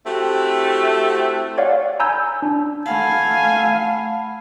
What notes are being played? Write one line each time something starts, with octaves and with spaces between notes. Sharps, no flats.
A3 C4 E4 F#4 G4
C#5 D5 F5 F#5
G#5 A#5 B5 E6 G6 G#6
D4
A3 F5 F#5 G#5 A5 B5